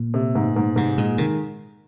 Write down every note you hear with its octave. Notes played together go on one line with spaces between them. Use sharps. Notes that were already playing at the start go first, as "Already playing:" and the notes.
Already playing: A#2
C3
G#2
G#2
G#2 C3
A#2 G#3
C3 D#3